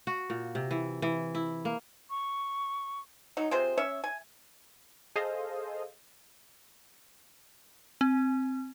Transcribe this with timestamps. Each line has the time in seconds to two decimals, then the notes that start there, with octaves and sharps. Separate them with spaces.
0.07 F#4
0.30 A#2
0.55 C3
0.71 E3
1.02 E3
1.35 E4
1.65 A#3
2.10 C#6
3.37 F#3 D#4
3.51 C3 F4 G#4 C5
3.78 C#4 C#5 E5
4.04 G#5
5.16 G#4 A4 C5 D#5 F5
8.01 C4